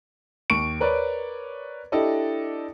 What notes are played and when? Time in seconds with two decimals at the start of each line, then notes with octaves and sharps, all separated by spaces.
0.50 D#2 C#6 D7
0.80 A#4 B4 C#5 D5
1.92 D4 E4 G4 A4 D5 D#5